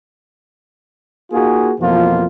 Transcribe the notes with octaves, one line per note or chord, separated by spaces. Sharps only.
A#3 D#4 F4 F#4 G#4
F2 B2 E3 F3 A#3 F4